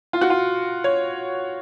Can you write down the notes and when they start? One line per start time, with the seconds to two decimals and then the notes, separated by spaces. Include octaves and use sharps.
0.13 F4
0.21 F#4
0.30 F4
0.84 C#5